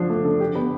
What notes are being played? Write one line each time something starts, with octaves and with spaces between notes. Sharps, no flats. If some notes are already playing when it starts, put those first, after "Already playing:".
Already playing: D3 F3 D4
A3
D3
G4
B3